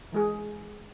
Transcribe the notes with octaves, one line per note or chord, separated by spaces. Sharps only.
E3 G#3 G#4